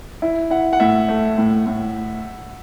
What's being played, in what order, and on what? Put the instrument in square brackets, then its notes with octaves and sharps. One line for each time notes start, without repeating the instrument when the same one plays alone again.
[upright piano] E4
[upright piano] E4 [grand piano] F#5
[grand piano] F#5
[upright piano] A2 [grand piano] E5
[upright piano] A3
A2
A2